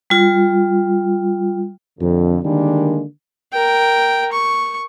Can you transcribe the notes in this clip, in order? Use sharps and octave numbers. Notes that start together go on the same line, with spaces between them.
G3 F4
F2 D3
D3 D#3 G3 G#3 A#3 D4
A#4 G5
C#6